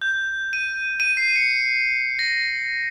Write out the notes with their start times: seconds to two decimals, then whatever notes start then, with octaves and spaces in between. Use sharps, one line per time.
0.02 G6
0.53 D#7
1.00 D#7
1.17 C7
1.36 C#7
2.19 A#6